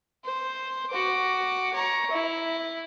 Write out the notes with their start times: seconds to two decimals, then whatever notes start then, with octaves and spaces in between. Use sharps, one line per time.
0.25 C5
0.90 F#4 D6
1.73 C#5 A#5
2.11 E4